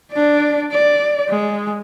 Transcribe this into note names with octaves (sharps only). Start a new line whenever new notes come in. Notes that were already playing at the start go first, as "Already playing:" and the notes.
D4 D5
D5
G#3